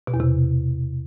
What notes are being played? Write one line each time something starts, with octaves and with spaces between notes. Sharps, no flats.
B2
E2
C3